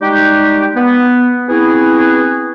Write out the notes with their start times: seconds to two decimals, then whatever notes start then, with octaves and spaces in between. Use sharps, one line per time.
0.01 G3 G#3 D#4 F#4 G4
0.75 B3
1.49 B3 C4 E4 F#4 G#4